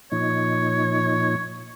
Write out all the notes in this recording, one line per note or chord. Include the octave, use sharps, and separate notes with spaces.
A#2 F3 D#4 C#5